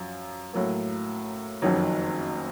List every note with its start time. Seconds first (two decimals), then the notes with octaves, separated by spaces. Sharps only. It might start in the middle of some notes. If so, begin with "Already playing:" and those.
Already playing: F#2 F3
0.53 A2 F#3 A#3
1.62 F#1 F2 D#3 F#3